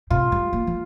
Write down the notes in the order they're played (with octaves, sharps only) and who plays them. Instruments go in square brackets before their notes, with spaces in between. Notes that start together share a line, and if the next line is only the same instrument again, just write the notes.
[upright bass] C3 [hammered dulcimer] F4
[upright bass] G3
A#3
F3